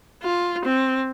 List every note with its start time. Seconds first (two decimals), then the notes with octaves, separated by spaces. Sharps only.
0.23 F4
0.65 C4